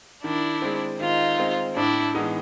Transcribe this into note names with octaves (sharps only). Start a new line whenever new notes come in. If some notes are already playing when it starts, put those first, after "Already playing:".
D#3 D4 E4
G#3 C4
D#3 D#4 F4
G#3 C4
A2 D4 E4
E3 G#3 B3 D#4